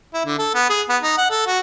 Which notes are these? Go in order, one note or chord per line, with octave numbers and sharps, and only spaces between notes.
E4
D3
A4
B3
G#4
B3
D#4
F#5
A4
F#4